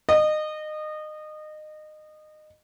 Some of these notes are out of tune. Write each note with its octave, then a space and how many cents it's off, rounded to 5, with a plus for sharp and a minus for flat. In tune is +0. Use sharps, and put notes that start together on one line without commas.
D#5 -25